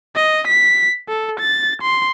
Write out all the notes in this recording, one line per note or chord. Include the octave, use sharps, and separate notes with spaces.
D#5
B6
A4
A6
C6